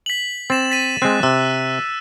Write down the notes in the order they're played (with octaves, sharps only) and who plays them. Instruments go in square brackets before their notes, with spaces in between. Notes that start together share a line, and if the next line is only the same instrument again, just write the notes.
[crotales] B6 F#7
[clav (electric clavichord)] C4 [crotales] A6 E7
[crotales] A6 B6 D#7
[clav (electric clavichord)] G#3 C4 [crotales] F#6
[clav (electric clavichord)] C3 [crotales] E6 F#6